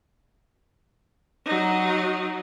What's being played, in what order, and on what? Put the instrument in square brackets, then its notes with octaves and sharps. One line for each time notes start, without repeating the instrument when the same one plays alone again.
[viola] F#3 D#4